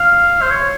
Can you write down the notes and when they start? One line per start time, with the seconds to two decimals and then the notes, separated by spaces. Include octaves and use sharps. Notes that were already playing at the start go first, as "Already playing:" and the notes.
Already playing: F5
0.42 C5
0.50 C#5